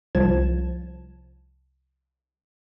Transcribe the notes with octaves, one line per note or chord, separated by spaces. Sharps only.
C2 F3 A5 G#6 E7